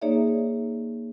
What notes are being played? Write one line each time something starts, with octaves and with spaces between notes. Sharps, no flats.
A#3 D#4 G#4 C#5 D5 E5